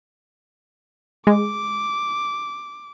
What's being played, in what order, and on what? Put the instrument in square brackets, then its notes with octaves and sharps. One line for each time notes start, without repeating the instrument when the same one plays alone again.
[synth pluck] G#3 [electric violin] D6